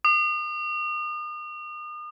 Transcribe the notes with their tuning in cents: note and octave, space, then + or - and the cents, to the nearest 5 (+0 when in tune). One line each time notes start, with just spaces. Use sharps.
D#6 -40